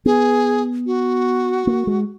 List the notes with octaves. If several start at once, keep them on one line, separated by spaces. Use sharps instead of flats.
B3 G#4
F#4
A#3
G#3